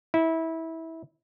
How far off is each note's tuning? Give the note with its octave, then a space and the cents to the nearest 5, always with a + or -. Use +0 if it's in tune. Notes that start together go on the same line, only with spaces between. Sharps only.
E4 -20